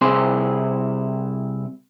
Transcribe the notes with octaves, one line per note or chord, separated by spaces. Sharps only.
C2 C3 C4 E4 G#4 C6